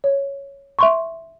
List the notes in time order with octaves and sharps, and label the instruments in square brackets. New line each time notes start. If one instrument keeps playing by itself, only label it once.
[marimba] C#5
E5 C6 C#6